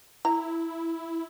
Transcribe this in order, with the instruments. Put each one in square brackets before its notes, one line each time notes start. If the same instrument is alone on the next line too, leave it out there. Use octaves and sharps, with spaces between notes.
[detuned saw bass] E4 [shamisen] A#5